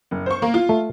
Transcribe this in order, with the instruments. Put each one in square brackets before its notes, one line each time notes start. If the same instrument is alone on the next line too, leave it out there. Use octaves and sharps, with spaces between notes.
[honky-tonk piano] F#1
C5 C#6
A#3
F4
[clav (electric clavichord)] A3